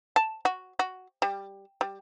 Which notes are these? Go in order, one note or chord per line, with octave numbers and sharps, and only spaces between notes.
A5
F#4
F#4
G3
G3